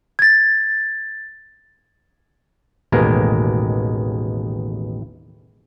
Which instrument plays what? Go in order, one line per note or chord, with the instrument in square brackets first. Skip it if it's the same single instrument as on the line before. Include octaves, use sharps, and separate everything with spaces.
[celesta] G#6 A6
[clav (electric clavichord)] A1 D#2 B2 G#3 A#4